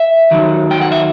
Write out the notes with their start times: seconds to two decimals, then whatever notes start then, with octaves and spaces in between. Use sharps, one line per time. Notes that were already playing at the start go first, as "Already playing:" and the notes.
Already playing: E5
0.31 D#2 D#3 F#3
0.71 G5
0.82 F#5
0.92 E5